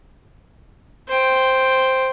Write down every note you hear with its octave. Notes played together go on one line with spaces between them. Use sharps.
C5 G5